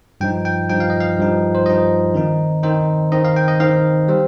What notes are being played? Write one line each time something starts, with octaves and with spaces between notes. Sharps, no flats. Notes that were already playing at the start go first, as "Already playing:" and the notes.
G2 F3 D#4 G5
G5
G2 F3 D#4 G5
F5
D#5
F5
G2 F3 D#4
C5
G2 F3 D#4 D#5
D#3 C4 D#4
D#3 C4 D#4 C5
D#3 C4 D#4 D#5
F5
G5
D#5
D#3 C4 D#4 F5
G3 C4